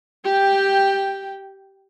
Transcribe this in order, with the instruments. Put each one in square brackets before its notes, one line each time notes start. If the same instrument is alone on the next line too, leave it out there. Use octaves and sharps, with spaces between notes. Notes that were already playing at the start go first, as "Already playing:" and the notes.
[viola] G4 G5